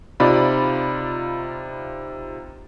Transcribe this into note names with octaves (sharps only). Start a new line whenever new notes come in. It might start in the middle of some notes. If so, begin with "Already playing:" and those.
C3 D#4 F4 D5 B5